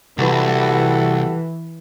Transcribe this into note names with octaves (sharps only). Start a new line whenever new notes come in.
C2 E3 F#4 G4 A4